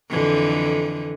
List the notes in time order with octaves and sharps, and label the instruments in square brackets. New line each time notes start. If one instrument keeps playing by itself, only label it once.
[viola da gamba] F2 D3 E3